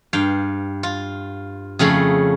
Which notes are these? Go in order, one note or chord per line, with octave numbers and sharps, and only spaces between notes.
G2 F5 G5
F4
F2 C#3 A3 G#4 B5